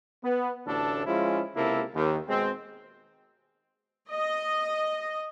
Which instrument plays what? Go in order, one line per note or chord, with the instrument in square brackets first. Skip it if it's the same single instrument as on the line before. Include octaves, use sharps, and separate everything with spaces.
[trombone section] B3
A1 D2 A2 D4 A4
F3 G#3 C#4 E4 F4
C#2 C3 A#3 E4 A4
D#2
B2 G#3 C4
[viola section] D#5